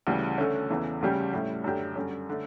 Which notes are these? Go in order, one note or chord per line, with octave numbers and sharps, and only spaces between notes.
D2 C#3 E3 G3
D3 A3 C#4
E2 C#3 E3 A3 E4
D2 C#3 G3 C#4 G4
A2 G3 C#4 E4
F#2 D3 A3 D4 G4
F#2 D3 G3 C#4
D3 A3